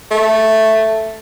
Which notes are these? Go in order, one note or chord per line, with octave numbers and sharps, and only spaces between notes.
A3